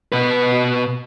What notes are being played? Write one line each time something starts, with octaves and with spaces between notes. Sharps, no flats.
B2 B4